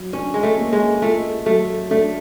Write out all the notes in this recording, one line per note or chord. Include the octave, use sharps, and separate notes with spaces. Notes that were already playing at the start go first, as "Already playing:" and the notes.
Already playing: F#3
C#4 D4
G#3
A3
A#3
G#3
A3 F4
F#3 A3
A3 D4